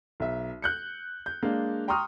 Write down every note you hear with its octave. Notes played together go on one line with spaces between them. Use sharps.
B1 E5
F#6 G6 C#7
G6
G#3 A#3 D4 F5
G5 A#5 C6 C#6 D#6 F6